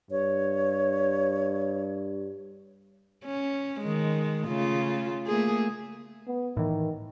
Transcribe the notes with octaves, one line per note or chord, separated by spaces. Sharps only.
G2 C#5
C#4
D#3 G#3
C#3 A3 F4
A3 A#3 G#4
B3
A2 D#3 E3